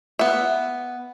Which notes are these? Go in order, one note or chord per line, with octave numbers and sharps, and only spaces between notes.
B3 E5